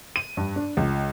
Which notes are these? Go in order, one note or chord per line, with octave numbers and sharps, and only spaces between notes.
D#7
G2
D4
C#2